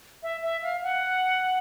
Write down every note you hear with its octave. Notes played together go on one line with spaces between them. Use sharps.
E5
E5
F5
F#5